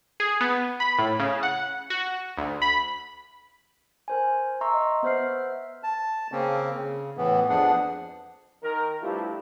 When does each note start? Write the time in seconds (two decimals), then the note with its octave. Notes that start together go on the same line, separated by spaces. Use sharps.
0.20 G#4
0.41 B3
0.80 B5
0.99 A2
1.20 C#3
1.43 F#5
1.90 F#4
2.37 D2
2.62 B5
4.08 A#4 C5 G#5
4.61 E5 A#5 C6 C#6 E6
4.74 D#5
5.03 B3 B4 C5 E5 F6 C7
5.83 A5
6.32 C#3 A#3 C4 C#4
6.75 C#3
7.17 A2 E3 B3
7.49 F2 F3 B3 D4 G#4 F#5
8.63 D#3 A#4
9.02 G2 F3 A3 E4 F4 G4